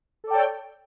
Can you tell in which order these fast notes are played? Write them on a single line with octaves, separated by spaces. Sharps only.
A4 D5 G5 C#5